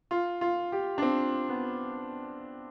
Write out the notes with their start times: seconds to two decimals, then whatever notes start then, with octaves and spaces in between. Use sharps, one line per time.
0.11 F4
0.41 F4
0.72 G4
0.98 D4
1.02 C4
1.49 B3